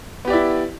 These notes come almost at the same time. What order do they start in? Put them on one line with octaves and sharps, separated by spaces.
B3 G4 D5 E4